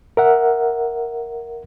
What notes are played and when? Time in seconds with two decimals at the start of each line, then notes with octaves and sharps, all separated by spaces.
0.17 A#4 E5 F#5